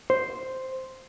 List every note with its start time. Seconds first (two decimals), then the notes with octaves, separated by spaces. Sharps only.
0.10 C5